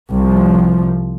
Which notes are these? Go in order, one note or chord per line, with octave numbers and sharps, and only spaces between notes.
C2 F3